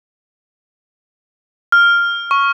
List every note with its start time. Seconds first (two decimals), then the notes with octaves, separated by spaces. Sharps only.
1.72 F6
2.31 C#6